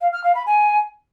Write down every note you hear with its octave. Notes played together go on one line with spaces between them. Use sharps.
F5
F6
F5
B5
G#5